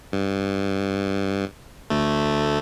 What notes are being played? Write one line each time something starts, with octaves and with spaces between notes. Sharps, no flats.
G2
D2 A3